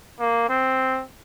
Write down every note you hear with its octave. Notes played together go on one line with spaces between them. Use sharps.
A#3
C4